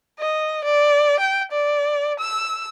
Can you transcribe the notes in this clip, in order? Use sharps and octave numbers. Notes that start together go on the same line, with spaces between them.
D#5
D5
G5
D5
E6